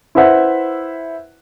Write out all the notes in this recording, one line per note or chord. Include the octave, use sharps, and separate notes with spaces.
E4 B4 C5 E5 F#5